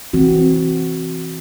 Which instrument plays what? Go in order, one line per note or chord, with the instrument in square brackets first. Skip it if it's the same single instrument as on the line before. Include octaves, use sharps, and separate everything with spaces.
[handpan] E3 C4 F#4